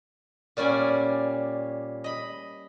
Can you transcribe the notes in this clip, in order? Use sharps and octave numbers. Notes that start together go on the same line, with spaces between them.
A#2 G3 C#4 D5 F#5 G#5
D#5 B5